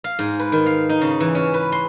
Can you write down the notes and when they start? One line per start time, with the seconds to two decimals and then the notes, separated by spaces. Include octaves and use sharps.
0.04 F5
0.19 G#2
0.39 B4
0.52 D#3
0.66 F5
0.89 D#4
1.01 C#3
1.20 E3
1.35 C#4
1.54 B4
1.72 C6